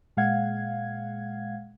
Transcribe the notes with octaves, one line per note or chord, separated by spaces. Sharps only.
A#2 G#3 F5 F#5 G#6